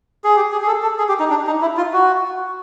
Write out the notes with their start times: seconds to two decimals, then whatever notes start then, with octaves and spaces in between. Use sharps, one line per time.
0.24 G#4
0.36 G4
0.52 G#4
0.62 G#4
0.67 A4
0.82 A4
0.98 G#4
1.09 G4
1.20 D#4
1.30 D4
1.47 D#4
1.62 E4
1.77 F4
1.93 F#4